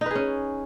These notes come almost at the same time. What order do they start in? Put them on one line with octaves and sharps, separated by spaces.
D#4 B4 G#4 C#4